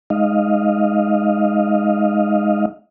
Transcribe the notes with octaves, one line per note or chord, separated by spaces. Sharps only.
G#3 D#4 D#5 F5